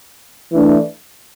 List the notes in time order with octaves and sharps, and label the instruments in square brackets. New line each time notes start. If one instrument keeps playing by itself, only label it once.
[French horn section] E3 A3 D4